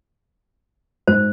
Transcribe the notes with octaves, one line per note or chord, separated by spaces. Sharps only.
G#2 C5